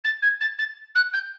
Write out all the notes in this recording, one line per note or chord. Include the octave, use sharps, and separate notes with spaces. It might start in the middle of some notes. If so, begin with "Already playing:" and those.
A6
G#6
A6
A6
F#6
G6